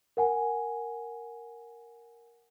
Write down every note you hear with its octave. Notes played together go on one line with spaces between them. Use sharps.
A#4 F#5 G#5